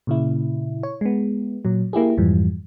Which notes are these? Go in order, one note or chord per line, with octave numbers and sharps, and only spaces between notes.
A#2 C#3 E4
C#5
G#3 B3
A#2 F#3
A#3 E4 G4 G#4
F2 G#2 E3 F3 G3